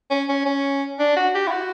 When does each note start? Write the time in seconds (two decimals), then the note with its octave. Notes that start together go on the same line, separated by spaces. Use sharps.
0.11 C#4
0.29 C#4
0.46 C#4
0.99 D4
1.16 F#4
1.35 G4
1.47 E4
1.51 F#4